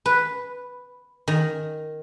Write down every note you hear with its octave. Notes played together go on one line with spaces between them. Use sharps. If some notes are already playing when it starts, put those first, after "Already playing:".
B4
D#3